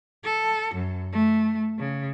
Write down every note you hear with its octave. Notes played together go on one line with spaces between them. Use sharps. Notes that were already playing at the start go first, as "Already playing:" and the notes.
A4
F#2
A3
C#3